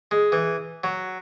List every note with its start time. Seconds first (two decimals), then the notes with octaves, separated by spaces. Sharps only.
0.11 G#3
0.32 E3
0.84 F#3